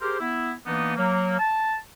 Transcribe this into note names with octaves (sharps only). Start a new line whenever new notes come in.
G4 G#4 A#4 C5
B3 E4
E3 A#3 B3 D4 D#4
F#3 A#3
A5